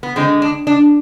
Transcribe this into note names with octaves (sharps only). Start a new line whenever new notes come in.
B3
D3 G#3 C4
D4
D4